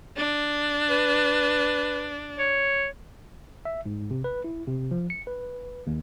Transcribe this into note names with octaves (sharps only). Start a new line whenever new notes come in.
D4
B4
C#5
E5
G#2
C3
B4
E4
C3
F3
C#7
B4
D#2